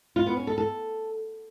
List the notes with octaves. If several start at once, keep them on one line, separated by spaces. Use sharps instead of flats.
F4
B3
C#4
A4
A4